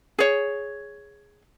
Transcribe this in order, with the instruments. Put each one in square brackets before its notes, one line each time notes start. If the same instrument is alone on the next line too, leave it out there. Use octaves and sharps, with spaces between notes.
[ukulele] G#4 C#5